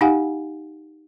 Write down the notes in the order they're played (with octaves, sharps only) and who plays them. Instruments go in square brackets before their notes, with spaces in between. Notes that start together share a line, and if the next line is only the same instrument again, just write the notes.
[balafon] D#4 G4 F5 F#5 G#5